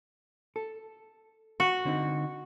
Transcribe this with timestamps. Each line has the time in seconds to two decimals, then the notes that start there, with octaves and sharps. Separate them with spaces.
0.56 A4
1.60 F#4
1.85 D3 C4 D#4